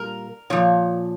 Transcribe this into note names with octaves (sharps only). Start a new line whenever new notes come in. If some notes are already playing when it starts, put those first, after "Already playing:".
Already playing: A#2 G3 A#4
A#2 F3 C#5